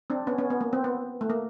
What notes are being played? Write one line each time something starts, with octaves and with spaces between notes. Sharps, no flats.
C4 D4
B3 C#4
B3 C#4
B3
A#3
C4
B3
A3
A#3